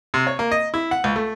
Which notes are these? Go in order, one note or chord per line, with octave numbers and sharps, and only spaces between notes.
C3
C#5
A#3
D#5
E4
F#5
C#2
A3